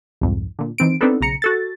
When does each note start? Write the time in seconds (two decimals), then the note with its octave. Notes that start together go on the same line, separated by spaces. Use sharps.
0.21 C2 F2 G#2
0.59 A#2 D3
0.78 D#3 E3 C4 D7
1.01 B3 C4 D4 D#4 A4 B4
1.21 B1 C#3 A#5 C#7
1.42 F#4 A4 A6